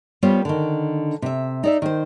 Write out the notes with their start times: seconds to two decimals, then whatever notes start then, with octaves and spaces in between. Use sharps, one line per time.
0.23 G3 B3 F4 C5 C#5
0.45 D3 D#3
1.22 C3 E5
1.64 D#4 D5 E5
1.82 D#3 C5